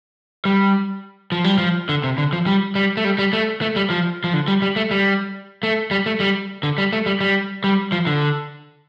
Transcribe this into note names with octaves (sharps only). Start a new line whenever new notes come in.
G3
F3
G3
F3
D3
C3
D3
F3
G3
G3
A3
G3
G3
A3
A3
G3
F3
F3
D3
G3
G3
A3
G3
A3
G3
A3
G3
D3
G3
A3
G3
G3
G3
F3
D3